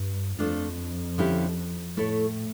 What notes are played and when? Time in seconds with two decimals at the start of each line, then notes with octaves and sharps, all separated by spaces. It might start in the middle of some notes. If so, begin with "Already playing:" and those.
Already playing: G2
0.39 F2 F3 A3 D4 F4
1.18 D3 F3 C#4 E4 G4
1.97 A2 A3 E4 A4 C#5